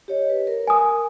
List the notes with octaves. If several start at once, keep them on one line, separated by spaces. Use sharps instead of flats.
G4 C#5 D#5
B4
A#4
G#5 D#6